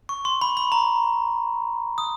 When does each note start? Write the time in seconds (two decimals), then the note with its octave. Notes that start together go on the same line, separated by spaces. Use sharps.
0.09 C#6
0.25 C6
0.41 B5
0.57 B5
0.72 A#5
1.98 D#6